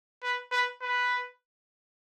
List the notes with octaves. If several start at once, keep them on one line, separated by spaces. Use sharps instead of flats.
B4
B4
B4